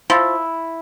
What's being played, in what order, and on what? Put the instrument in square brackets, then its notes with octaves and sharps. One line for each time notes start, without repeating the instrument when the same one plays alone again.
[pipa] F3 [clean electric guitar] E4